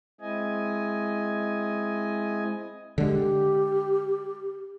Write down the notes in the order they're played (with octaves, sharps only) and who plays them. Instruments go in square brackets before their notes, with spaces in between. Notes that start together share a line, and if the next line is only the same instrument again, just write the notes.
[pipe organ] G#3 C4 E4 D#5 G#5
[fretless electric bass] D3 G#3 [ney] G4